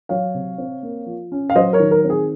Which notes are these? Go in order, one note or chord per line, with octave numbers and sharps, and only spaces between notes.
F#3 C#5 F5
C3
C4
A#3
F3
C#4
F5
F#3 C5 D#5
A#4 C#5
D#3
A#4
C4
G#4